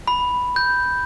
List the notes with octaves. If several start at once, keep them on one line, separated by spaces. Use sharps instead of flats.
B5
G6